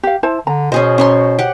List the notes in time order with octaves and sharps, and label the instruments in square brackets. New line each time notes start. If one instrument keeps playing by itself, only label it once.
[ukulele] G4 F5
E4 C5 A5
[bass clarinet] D3 [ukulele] A#5
[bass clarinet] B2 [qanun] C#4 G#4 C5 [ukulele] D#5
[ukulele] C#4 A#5 [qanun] C5 C#5 C6
[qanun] G4 F#5